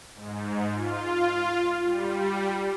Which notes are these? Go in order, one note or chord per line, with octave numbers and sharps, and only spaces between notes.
G#2
F4
G3